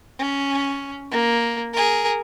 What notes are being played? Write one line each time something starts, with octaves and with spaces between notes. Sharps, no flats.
C#4
A#3
G#4 A#4